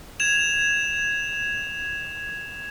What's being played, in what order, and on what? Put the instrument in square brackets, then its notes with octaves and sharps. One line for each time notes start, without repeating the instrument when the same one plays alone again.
[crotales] G#6 E7 F7